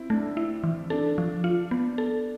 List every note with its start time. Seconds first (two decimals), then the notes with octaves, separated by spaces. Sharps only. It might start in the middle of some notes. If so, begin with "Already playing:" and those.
Already playing: C4 E4
0.10 A3 D4
0.37 E4
0.64 E3
0.90 D4 A4
1.18 F3
1.44 F4
1.71 B3
1.98 A4